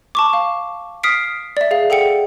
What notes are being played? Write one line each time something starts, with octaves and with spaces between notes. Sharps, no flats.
A5 C#6 D6
F5
D#6 F6 B6 C7 D7
D5 E5
G#4 F5
G#4 A4 F#5 G5 C#7